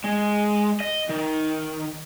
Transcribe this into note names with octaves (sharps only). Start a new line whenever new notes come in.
G#3
D#5
D#3